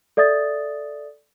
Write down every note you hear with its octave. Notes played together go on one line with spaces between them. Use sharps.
A4 D5 E5 D#6 A6